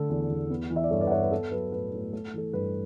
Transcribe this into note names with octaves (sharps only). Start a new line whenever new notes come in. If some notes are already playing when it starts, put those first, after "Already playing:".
Already playing: D3 A3 A4
E2
E2
B3
E3
E5
D5
G2 A4 C#5
B4 D5
F#5
G2 C#5 E5
B4
B3 A4
F#3 B4
A2 B4
A2
A3 A4
E3 A4
G2 B4